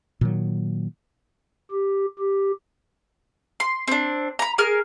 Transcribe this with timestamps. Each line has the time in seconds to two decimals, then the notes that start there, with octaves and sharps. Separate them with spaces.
0.21 A#2 D#3 F#3
1.71 G4
2.19 G4
3.60 C6
3.88 C4 D4
4.39 A#5 B5
4.58 G#4 A#4 F6